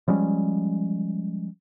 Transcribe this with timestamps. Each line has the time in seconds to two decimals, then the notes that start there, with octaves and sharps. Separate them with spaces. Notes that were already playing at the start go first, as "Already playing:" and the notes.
0.08 F3 G3 G#3 C#4